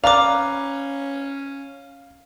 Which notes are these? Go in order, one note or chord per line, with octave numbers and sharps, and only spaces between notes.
C#4 A#4 B4 D5 F5 A#5 D6